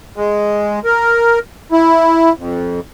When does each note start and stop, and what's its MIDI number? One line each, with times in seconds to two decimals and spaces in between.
0.16 0.80 56
0.85 1.39 70
1.72 2.33 64
2.37 2.80 41